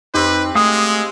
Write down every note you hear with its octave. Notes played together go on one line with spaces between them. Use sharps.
F2 C4 D#4 G4 B4
G#3 A3 F5 D#6